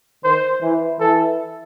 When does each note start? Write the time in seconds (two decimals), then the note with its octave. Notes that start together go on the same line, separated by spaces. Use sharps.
0.24 D#3 C5
0.62 E3
1.00 E3 A4